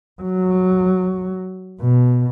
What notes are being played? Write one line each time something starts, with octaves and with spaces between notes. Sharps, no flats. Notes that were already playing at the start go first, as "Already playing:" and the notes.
F#3
B2